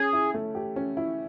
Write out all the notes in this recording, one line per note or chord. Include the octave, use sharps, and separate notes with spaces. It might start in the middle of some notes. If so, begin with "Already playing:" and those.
Already playing: C#4 G#4
E4
A3
G4
C#4
E4